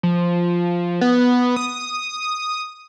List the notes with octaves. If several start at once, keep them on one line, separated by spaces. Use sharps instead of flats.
F3
B3
D#6